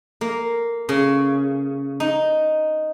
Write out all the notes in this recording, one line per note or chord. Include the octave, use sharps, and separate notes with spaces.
A#3
C#3
D#4